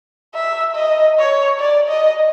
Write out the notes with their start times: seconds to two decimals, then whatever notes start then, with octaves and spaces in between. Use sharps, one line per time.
0.34 E5
0.75 D#5
1.19 C#5
1.60 D5
1.89 D#5